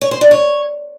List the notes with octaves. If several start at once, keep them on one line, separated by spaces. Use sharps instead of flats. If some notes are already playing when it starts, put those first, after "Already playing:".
C#5
C5
D4
C#5